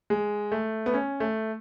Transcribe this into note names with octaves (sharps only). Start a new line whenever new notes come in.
G#3
A3
B3
C#4
A3